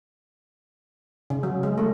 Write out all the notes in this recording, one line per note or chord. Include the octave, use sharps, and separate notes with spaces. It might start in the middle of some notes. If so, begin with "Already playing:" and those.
C#3
F#3
G#3
A3